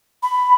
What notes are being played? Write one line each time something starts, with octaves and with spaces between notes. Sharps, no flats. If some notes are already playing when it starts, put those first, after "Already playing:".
B5